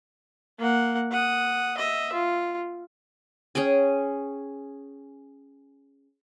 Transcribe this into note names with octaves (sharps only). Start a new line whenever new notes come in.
A#3 F#5
F#5 D#6
D#5 E5
F4
C#4 G#4 G5 G#5